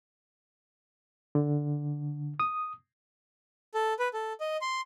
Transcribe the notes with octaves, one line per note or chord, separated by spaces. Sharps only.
D3
D#6
A4
B4
A4
D#5
C6